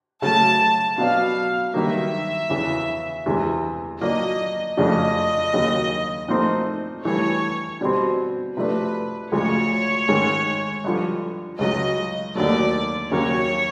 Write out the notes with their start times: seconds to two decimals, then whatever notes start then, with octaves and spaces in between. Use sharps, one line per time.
0.22 C#3 F#3 A3 A5
0.98 B2 F#3 B3 D4 F5
1.74 G2 D#3 F#3 A#3 E5
2.49 E2 C#3 E3
3.26 E2 C3 E3 G#3
4.01 A#2 F#3 A#3 D4 D#5
4.77 F2 C#3 F3 A3 D4 D#5
5.53 D#2 C#3 F#3
6.28 A#2 F3 A3 C4 D#4
7.04 G2 E3 A3 C#5
7.81 B2 G3 C4
8.56 C3 F3 A3 D4 B4
9.32 D2 C#3 F3 G#3 C#5
10.08 G#2 D#3 G#3 C#4
10.84 G2 D3 F3
11.59 C#2 C#3 F#3 D#5
12.35 D#2 D3 F#3 A3 D5
13.11 D#2 C#3 F#3 A#3 C#4 C#5